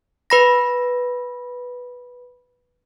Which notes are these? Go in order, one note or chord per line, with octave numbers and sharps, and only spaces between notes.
B4 B5 A#6